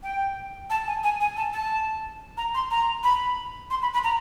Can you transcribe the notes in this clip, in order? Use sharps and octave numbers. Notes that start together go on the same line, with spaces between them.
G5
A5
G#5
G#5
G#5
A5
A5
A#5
C6
A#5
B5
C6
B5
B5
A#5